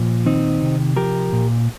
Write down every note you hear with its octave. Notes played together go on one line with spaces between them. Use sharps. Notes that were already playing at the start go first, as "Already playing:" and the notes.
Already playing: A#2 F3
D#3 C4 D#4
C3
F3 G4 A#4
A#2